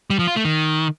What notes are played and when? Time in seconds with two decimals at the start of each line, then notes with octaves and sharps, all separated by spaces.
0.10 G3
0.19 F3
0.27 F4
0.36 A3
0.45 D#3